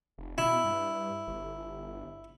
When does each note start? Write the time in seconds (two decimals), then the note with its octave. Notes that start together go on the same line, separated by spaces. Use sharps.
0.18 F1
0.38 B2 E4
0.64 G2
1.27 G1